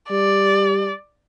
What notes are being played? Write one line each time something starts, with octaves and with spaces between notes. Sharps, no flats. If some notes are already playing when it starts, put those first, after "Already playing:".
G3 D5